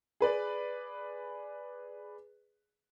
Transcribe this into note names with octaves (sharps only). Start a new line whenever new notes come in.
G#4 B4 D5